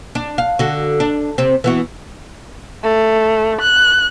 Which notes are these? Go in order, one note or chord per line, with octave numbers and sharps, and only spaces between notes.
D4
F5
D3 F#4
D4
C3 C4
E3 B3 F#4
A3
F#6